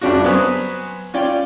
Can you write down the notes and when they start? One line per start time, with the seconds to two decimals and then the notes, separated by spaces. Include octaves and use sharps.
0.01 F#2 C#3 G3 D4 F4 F#4
0.24 F#3 B3 B4 C5 G#5 D#6
1.14 C#4 F4 D5 G5